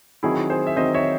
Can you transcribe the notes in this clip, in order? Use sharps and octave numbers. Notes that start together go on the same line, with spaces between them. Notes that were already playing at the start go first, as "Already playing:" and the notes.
D#3 F#3 C4 E4 G#4
G#4 C5
E5
D#3 F#3 C4 C5 D#5
C#5 E5